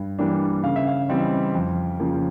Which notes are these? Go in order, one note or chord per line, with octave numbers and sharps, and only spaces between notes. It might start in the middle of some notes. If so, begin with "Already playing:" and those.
Already playing: G2
E3 G3 A#3 D4
C#3 F5
E5
F5
E3 G3 C4 D#4
F2
C#3 F3 A#3